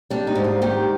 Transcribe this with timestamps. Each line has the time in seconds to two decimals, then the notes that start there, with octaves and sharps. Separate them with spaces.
0.10 G3 D4
0.27 D#4
0.35 G#2
0.44 F4
0.62 D#3 G4